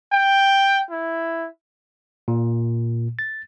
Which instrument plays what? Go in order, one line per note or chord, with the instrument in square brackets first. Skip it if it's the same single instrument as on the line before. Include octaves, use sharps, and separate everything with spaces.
[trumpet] G5
E4
[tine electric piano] A#2
A6